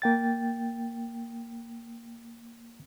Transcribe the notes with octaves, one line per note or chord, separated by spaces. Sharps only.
A#3 G5 A6